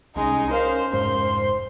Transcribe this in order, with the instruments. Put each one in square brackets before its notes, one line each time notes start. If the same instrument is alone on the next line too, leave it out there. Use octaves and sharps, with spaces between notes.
[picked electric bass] C2 [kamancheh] G#3 D#4 [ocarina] C#4
[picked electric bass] C#4 [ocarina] A#4 [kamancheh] C5 F5
[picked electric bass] F1 G#2 [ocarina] C5 [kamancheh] C6